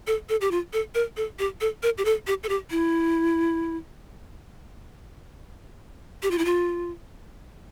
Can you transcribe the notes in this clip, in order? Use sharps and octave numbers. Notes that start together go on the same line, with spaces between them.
A4
A4
G4
F4
A4
A#4
A4
G4
A4
A#4
G4
A4
G4
A4
G4
E4
G4
F4
E4
F4